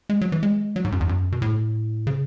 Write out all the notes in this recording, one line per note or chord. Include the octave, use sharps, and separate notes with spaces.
G#3
F#3
E3
G#3
F#3
G#2
F#2
E2
F#2
B2
A2
C#3